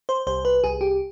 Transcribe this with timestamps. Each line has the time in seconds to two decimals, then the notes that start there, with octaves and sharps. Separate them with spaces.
0.09 C5
0.27 C2 C5
0.45 B4
0.64 C2 G#4
0.81 G4